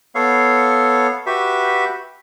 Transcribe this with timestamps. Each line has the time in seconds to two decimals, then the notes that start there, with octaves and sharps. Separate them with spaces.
0.15 B3 A4 C#5 F5
1.26 F#4 G4 B4 E5